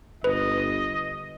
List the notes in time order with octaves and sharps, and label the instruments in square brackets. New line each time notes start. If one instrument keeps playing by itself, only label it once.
[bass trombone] G1 [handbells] B4 [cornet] D#5